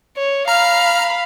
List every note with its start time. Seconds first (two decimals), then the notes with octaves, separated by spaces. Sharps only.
0.17 C#5
0.48 F5 A#5 B5 F6